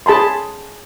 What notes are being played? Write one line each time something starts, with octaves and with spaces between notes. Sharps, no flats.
G#4 A5 B5 C6